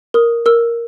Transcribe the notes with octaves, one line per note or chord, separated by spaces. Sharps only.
A#4 D#6
A#4 E6